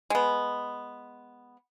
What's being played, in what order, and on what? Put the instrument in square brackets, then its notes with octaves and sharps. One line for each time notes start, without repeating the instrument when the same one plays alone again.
[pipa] G#3 B3